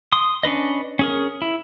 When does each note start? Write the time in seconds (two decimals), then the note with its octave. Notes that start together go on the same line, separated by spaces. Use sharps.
0.12 C6 D#6
0.43 C#4 D4 B4 D#5
0.99 C#4 G#4 A#4
1.42 E4